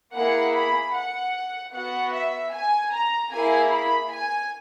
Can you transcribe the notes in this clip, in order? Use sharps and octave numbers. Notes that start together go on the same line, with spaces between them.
A#3 E4 G#4 F#5
B5
F#5
B3 F#4 F#5
E5
G#5
A#5
A#3 E4 G#4 G#5
B5
G#5